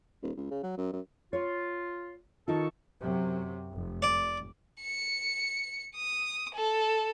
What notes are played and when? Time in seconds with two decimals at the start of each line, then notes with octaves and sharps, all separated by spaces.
0.22 D#1
0.37 C#2
0.51 C#3
0.63 F#3
0.77 F#2
0.93 F#2
1.33 F4 C#5
2.48 D#3 D#4 F4 A4 A5 C#6
3.01 F#2 C3 F#3
3.72 F1
4.02 D5
4.82 C#7
5.96 D#6
6.54 A4